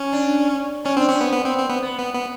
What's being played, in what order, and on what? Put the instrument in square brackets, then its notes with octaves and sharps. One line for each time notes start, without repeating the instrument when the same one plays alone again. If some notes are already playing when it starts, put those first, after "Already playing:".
Already playing: [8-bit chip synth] C#4
[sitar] D4
[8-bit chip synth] C#4 [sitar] D4
[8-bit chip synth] C4 [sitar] D4
[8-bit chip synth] C4 [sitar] C#4
[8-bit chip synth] B3
B3
C4
C4
B3
[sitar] B3
[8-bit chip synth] B3
B3